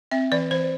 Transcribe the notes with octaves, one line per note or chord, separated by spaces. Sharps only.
C4 E5
E3 D5
E3 C5